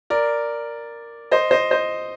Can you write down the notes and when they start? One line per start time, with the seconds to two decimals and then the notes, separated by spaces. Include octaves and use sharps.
0.10 A#4 D5
1.31 C5 D#5
1.51 C5 D#5
1.71 C5 D#5